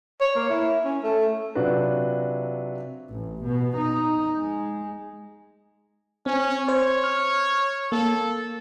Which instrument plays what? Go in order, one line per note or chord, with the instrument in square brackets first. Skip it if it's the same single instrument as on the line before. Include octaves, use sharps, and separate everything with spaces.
[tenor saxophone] C#5
A#3
E4
C#4
A3
[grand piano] C3 F#3 D4 F4 F#4 B4
[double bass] A1
B2
D#4
G#3
[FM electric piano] C4 [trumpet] C#4
[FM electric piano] C5 [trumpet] C#5
[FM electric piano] F6
[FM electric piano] A#3 [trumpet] A4